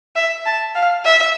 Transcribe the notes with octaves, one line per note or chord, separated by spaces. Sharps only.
E5
A5
F5
E5